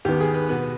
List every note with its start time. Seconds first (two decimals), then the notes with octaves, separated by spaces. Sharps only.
0.05 D#2 D#3 B3 G4
0.20 G#4
0.34 B4
0.49 B2 B3 B4